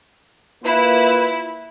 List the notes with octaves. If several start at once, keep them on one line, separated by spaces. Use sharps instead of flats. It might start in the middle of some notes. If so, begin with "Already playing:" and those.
A#3 E4 F4 B4